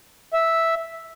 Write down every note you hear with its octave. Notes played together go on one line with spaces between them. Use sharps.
E5